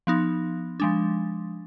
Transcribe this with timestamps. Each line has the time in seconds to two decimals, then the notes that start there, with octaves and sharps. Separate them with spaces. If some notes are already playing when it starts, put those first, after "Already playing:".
0.07 F3 B3 D#4
0.80 F3 G#3 D4